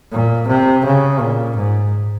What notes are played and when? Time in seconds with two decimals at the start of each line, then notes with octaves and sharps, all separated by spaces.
0.12 A#2
0.48 C3
0.85 C#3
1.20 A#2
1.57 G#2